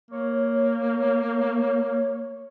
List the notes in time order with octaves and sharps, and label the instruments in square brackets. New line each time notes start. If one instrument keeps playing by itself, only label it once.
[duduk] A#3 [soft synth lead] C#5